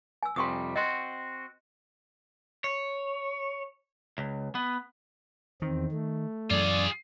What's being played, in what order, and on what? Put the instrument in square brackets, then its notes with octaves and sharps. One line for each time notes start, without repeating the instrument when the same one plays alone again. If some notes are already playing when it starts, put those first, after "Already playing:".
[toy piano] G#5 E6
[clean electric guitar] F2 C3 G3 [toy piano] C6 C#6 D#6
[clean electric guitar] C4 F#4 [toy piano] D#5 C6
[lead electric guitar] C#5
C#2
B3
[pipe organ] E2 C4 [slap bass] D#3
[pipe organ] A3
[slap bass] F#2 E3 [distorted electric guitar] F4 G#4 [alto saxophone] D5